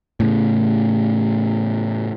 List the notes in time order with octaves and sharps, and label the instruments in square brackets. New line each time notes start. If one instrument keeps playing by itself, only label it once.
[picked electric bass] A2 C#3